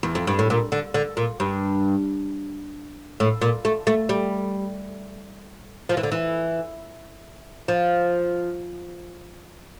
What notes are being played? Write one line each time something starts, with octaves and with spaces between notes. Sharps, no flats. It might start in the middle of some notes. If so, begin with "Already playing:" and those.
E2
F2
G2
A2
A#2
D3
D3
A#2
G2
A2
A#2
A3
A3
G3
F3
E3
D3
E3
F3